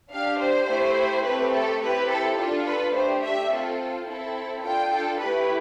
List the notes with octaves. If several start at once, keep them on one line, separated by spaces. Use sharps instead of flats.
D4 G4 F5
C5
A3 E4 G4
A3 C4 G4 B4
A4
C4 E4 G4 B4
A4
D4 F4 A4
B4
A3 D4 G4 C5
E5
C4 F4 A4
C4 E4 A4
D4 F4 A4 G5
A4
A3 E4 G4 B4